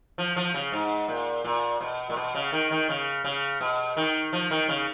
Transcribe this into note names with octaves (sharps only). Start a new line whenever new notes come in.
F3
F3
C#3
G#2
A#2
A#2
B2
A#2
B2
C#3
D#3
D#3
C#3
C#3
B2
D#3
F3
D#3
C#3